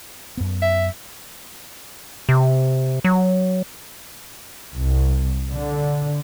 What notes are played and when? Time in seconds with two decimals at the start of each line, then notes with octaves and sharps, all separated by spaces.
0.37 F#2 B3
0.62 E5
2.29 C3
3.05 F#3
4.73 C2
5.51 D3